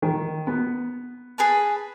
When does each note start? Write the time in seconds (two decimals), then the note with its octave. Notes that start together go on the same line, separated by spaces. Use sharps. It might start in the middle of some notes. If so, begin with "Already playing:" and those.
0.02 D#3
0.47 B3
1.38 G#4 B4 A5